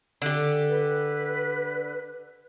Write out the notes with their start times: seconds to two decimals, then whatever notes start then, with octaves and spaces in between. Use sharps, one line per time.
0.22 D3 G4
0.70 B4